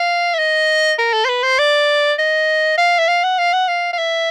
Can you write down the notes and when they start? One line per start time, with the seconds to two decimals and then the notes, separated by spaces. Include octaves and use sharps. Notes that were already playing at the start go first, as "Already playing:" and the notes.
Already playing: F5
0.34 E5
0.39 D#5
0.98 A#4
1.13 A4
1.25 C5
1.29 B4
1.43 C5
1.59 D5
2.19 D#5
2.78 F5
2.99 E5
3.08 F5
3.23 F#5
3.38 F5
3.53 F#5
3.68 F5
3.93 F5
3.98 E5